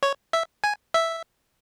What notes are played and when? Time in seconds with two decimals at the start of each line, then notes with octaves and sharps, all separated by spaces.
0.03 C#5
0.33 E5
0.64 G#5
0.94 E5